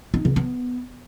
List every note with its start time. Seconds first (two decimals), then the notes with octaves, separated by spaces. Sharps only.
0.14 D#4
0.25 C#3
0.36 B3